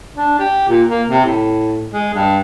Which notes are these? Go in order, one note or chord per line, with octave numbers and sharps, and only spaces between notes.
D4
G4
A#2
A#3
C3
A2
G#3
G2